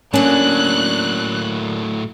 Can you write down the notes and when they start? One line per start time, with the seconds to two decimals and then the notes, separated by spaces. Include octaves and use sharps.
0.14 A2 F#3 A#3 C#4 D4 F#6